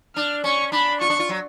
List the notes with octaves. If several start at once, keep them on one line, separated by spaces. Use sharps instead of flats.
D4 F6
C#4 C#6
D4 B5
F4 C#6
D4
F4
F#3